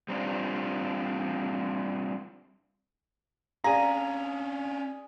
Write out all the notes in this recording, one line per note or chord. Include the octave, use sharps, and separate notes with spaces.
G3 C4 D4 F4
C#4 D4 G#4 D5 F5 A#5 D#7